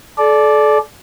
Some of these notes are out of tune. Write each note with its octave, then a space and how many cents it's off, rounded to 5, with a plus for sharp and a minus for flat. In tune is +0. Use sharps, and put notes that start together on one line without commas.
A4 -35 D5 +0